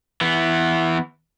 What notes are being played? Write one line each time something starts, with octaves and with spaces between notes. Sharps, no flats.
E3 B3